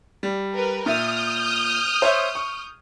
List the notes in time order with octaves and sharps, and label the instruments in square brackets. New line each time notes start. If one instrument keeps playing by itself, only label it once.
[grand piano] G3
[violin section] A#4 B4
[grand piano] A#2 E5 [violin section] D#6 F6 G6
[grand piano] C5 C#5 E5
C#6